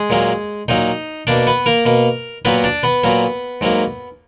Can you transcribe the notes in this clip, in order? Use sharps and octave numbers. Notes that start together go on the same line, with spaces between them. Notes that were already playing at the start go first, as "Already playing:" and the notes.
Already playing: G#3 G#4
A#2 F#3 A#3
A#2 F#3 A#3 D#4 D#5
B2 A#3 D4 D5
B3 B4
A#3 A#4
B2 A#3
A#2 F#3 A#3 B3 B4
D4 D5
B3 B4
A#2 F#3 A#3
G#2 F#3 A#3